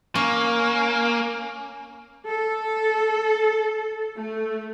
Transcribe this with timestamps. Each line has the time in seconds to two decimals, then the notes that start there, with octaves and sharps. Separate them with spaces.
0.15 A#3 C#4
2.26 A4
4.18 A3